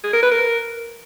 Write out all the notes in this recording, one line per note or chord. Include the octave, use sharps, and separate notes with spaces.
G#4
A#4
B4
A#4